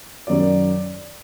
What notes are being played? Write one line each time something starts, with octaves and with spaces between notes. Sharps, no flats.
F#2 D#3 D5